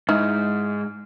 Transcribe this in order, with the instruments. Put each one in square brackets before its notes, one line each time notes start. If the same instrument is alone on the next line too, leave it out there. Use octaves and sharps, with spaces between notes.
[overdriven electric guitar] G#2 [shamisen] D#4 E4 [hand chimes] F6